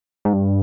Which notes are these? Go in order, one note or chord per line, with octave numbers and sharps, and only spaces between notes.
G#2
G2